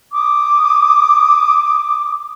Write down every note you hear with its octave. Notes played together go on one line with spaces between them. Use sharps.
D6 D#6